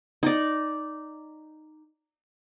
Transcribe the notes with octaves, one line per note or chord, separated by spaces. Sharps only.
D#4 D5